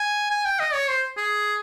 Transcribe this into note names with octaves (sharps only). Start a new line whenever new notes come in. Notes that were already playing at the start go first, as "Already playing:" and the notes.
Already playing: G#5
G#5
G5
D#5
C#5
C5
G#4